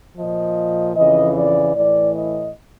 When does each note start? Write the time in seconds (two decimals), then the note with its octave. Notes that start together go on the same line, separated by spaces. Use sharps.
0.17 A#2 F3 D#5
0.95 F2 C#3 E3 D#5
1.35 D5
1.74 A2 E3 D5
2.13 D#5